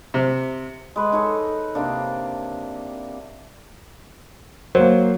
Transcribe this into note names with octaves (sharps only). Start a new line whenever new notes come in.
C3
G#3 B4
D#4 A4 C#5
C3 A#3 D4
F#3 A#3 C5